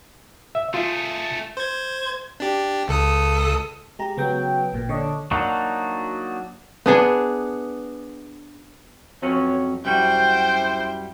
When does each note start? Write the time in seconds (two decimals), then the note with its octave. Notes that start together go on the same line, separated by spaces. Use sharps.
0.55 E5
0.74 A3 F4 G#4
1.57 C5 G#6
2.40 D4 G4
2.88 C#2 A4 D#6
3.99 G#3 G4 A#5
4.17 C#3 F#3 B3 G5
4.72 A1 A#2
4.89 D3 D4 C#5 D#5
5.31 F#3 A#3 D4 D#4 F#4
6.86 B3 D4 G#4
9.22 F2 F#3 C#4 C#5
9.85 F#2 G3 E4 F#4 C5 G5